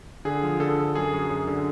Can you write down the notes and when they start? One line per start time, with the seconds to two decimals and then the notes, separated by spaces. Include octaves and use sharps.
0.25 D3 G#4
0.43 F3
0.60 D3 A4
0.78 D3
0.95 F#2 G#4
1.13 F#2
1.30 F#2
1.48 D3